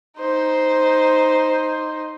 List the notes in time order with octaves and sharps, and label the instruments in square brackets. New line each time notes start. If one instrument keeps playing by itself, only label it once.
[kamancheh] D#4 C5